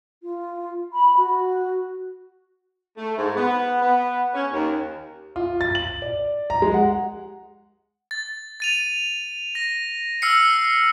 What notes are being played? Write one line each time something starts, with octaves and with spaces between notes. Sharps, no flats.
F4
B5
F#4
A3
G#2
B3
B3
C#4
D#2
F4
A6
F#7
D5
A#5
G#3
F#5
A6
A6 D#7 F7
A#6
E6 F6 C7 C#7